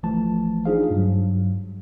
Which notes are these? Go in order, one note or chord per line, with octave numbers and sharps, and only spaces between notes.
G#1 E3 F3 A3 A5
D4 D#4 F4 G#4 C5 F5
G2 F#3